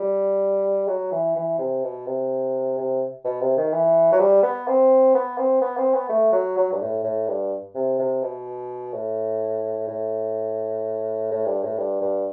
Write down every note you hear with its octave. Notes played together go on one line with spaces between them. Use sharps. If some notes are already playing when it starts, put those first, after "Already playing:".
Already playing: G3
F#3
E3
E3
C3
B2
C3
C3
B2
C3
D#3
E3
F#3
G3
B3
C4
B3
C4
B3
C4
B3
A3
F#3
F#3
G2
A2
A2
G2
C3
C3
B2
A2
A2
A2
G2
A2
G2
G2